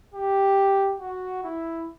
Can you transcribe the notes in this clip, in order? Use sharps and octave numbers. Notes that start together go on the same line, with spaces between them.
G4
F#4
E4